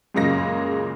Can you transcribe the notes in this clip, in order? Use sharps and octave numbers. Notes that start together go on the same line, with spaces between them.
F#2 A#2 C#3 G#3 A#3 A#6